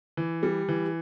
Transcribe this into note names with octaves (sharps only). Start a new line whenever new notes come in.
E3
G3
E3